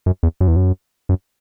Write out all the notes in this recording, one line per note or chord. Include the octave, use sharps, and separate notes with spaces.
F#2
E2
F#2
E2
F#2
F#2